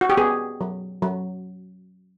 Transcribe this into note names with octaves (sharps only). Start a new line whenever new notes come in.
F#4
G4
B3 G#4
F#3
F#3